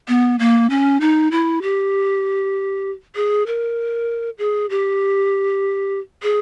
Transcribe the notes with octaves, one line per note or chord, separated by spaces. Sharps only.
B3
A#3
C#4
D#4
E4
G4
G#4
A#4
G#4
G4
G#4